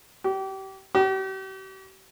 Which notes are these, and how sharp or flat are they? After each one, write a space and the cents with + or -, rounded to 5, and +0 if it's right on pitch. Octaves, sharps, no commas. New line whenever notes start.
G4 -30
G4 -40